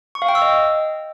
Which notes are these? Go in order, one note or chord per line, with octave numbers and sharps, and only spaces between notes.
C#6
F5
G5
E6
D#5